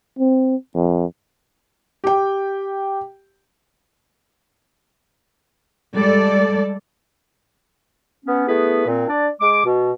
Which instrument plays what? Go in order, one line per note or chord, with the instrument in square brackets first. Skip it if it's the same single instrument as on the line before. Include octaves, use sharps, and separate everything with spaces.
[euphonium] C4
F2
[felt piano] G4 G5
[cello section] G3 G#3 A4 D5
[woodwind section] B3 C#4
A3 B3 E4 G#4 B4
A#2 C4
D4 D5
G#3 D6
B2